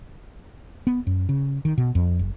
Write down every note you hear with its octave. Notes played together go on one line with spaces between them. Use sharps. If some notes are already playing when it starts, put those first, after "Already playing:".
B3
F#2
C#3
D#3
B2
F2
F#1